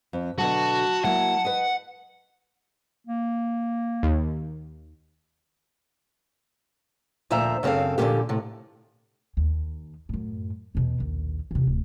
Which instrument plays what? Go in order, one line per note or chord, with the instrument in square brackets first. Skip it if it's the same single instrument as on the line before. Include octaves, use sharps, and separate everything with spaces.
[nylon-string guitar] F2
[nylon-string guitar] B2 D3 F#3 [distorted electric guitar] F#4 [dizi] A5
[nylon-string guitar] F#3 A#3 E4 [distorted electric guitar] F#5
[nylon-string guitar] B4 D#5
[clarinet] A#3
[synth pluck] D#2
[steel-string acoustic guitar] D2 A#2 F3 C5 E5 A#5
F#2 C#3 C4 A4 F5
A#2 D3 F3 G#3 A#3 G4
A2 C3
[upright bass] D#2
F#2 A2
E2 B2
A#1 D#2
E2 C3
D1